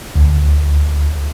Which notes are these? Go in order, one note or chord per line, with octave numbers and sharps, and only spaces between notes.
D2